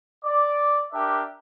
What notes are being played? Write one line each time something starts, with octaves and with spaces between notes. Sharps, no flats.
D5
D4 G4 A#4 E5